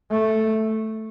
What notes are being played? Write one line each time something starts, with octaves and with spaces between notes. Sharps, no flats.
A3